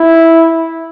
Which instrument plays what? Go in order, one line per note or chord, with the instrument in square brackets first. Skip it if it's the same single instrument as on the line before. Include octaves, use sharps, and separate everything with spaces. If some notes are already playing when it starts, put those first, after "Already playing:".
Already playing: [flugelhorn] E4